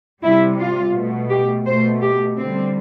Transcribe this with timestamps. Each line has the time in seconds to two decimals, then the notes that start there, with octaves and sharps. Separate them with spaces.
0.23 C3 G3 E4
0.59 F4
0.94 B2 A3
1.30 G4
1.66 B2 A3 C5
2.02 G4
2.37 D3 G3 C4